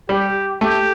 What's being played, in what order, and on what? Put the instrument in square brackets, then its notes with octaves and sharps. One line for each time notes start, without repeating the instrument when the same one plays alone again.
[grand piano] G3 [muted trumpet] G4
[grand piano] A3 [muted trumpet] G4